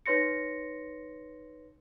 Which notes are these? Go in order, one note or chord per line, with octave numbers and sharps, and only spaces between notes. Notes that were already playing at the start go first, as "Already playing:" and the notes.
D#4 B4 C#5 C6 A#6 C#7